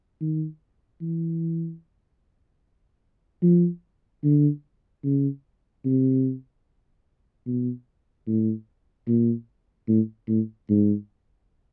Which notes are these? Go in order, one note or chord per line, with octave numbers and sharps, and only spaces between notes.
D#3
E3
F3
D3
C#3
C3
B2
A2
A#2
A2
A2
G#2